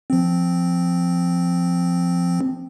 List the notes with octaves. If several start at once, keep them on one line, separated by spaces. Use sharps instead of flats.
F3 C4